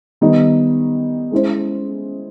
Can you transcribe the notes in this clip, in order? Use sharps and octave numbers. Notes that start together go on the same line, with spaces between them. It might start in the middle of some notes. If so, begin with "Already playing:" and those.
D#3 G3 B3 D#4
G#3 C#4 E4 G#4 C5